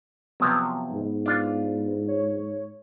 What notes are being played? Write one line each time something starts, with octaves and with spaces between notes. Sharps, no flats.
C3 F3 F#3 B3
G#2
D4 F4
C#5